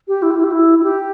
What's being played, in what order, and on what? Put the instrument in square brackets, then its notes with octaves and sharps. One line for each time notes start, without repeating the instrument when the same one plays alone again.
[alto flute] G4
E4
G4
E4
G4
E4
E4
G4